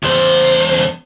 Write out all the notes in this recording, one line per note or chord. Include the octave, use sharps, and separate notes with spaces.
E2 C5